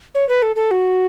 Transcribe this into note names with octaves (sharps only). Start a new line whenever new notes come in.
C#5
B4
A4
A4
F#4